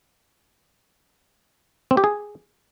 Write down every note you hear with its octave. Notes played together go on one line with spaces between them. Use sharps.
C4
G4
G#4